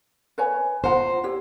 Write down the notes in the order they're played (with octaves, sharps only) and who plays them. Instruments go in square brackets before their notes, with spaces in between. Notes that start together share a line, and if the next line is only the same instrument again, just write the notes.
[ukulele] B4 C#5 G#5
[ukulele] F4 F#5 A#5 [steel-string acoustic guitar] C5
[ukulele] E4 G4 C#5